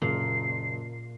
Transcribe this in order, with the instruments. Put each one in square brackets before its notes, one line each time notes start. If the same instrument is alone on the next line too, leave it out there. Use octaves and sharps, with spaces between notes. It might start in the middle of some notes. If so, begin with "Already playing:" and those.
[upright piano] F#1 [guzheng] A#2 [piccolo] C7